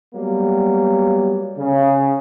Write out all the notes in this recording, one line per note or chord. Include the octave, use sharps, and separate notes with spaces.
F#3 G3 A#3 B3
C#3